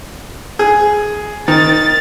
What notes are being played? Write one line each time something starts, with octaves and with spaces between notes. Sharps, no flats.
G#4
D#3 A6